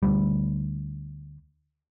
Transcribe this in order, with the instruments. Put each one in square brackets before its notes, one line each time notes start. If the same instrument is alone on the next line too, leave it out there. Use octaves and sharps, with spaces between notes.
[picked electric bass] D2 G3